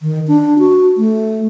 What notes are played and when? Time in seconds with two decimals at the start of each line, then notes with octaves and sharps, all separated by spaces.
0.01 D#3
0.28 D4
0.59 F#4
0.97 A3